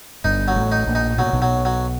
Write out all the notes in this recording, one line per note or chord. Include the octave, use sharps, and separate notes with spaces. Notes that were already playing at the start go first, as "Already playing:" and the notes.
G1 G2 D#4
F#3
A1 A2
D#4
A#1 A#2
D#4
B2 F#3
A#2
B1 B2
F#3
F#3